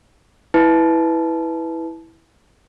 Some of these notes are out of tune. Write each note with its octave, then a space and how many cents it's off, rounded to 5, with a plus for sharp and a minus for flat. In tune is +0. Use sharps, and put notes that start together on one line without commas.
E4 -10 B4 +0 A5 -25